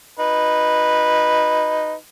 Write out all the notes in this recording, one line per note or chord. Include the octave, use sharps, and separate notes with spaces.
D#4 B4